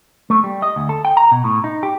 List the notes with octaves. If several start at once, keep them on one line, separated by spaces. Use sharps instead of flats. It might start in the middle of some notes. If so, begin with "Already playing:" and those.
A3
G3
D#5
D2
A4
G5
A#5
B2
A2
D#4
G4